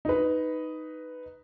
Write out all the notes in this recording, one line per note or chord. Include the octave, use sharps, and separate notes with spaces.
D#4 B4